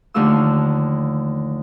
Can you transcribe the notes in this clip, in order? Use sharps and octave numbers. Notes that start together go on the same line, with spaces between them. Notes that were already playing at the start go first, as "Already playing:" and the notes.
D#2 D3 F3 A3 F4 E6